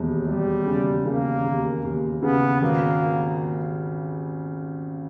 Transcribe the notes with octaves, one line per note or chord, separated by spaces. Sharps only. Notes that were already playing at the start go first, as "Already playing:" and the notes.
Already playing: E1 D#2
E1 G3
C#3
C#3 A#3
D#2
D#2
C#3 B3
G#1 A#3